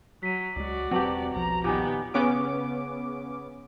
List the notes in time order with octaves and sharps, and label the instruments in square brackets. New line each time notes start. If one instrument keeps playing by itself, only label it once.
[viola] F#3 [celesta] B6 D#7
[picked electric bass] C#2 G#3 [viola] F#4 D5
[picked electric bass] E1 C4 [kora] F#3 G4 [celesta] B4 A5 F#7
[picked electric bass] E1 B1 F3 [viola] A#5
[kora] A#2 D#3 [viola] B3 G4 [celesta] G#5 D6
[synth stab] C#3 B3 C#4 D6